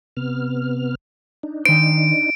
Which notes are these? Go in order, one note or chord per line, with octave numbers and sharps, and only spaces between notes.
C3 B3 F6
D4 D#4
D#3 C5 D7